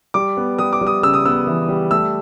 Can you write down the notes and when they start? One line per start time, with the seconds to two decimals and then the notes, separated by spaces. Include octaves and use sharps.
0.14 G3 D6
0.37 B3
0.58 G3 D#6
0.73 D6
0.81 G3
0.87 D#6
1.03 C#3 E6
1.14 D#6
1.25 B3 E6
1.47 E3
1.69 G3
1.91 A3 E6